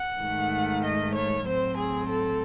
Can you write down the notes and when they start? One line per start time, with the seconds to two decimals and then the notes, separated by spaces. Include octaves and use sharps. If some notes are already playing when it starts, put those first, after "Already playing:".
Already playing: F#5
0.20 G#2 D#3 A3
0.83 D#5
1.14 C#5
1.44 A2 F#3 C4 C5
1.76 G#4
2.08 A4